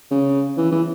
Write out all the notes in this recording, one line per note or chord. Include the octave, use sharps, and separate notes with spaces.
C#3
E3
E3